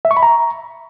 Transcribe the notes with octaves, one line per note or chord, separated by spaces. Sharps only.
E5
C#6
B5
A#5